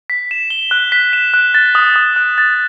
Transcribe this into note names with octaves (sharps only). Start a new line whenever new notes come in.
B6
E7
G7
F#6
B6
E7
F#6
A6
D#6
D#6
F#6
A6